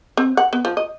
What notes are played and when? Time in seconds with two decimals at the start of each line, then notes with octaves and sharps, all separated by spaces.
0.17 C4
0.37 F#5
0.53 B3
0.65 F3
0.77 D#5